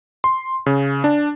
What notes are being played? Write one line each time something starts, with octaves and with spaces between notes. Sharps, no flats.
C6
C#3
D4